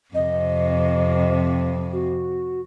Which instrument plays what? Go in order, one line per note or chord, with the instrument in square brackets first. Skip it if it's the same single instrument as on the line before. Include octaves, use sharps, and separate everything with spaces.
[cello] F2 C3 [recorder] D#5
[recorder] F#4